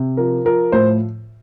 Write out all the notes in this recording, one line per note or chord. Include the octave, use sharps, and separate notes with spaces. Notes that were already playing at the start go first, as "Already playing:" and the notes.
Already playing: C3
F3 A#4
F3 A#4
A2 C5